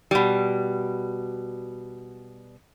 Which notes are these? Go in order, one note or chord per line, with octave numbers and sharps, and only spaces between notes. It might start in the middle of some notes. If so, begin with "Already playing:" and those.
B2 G3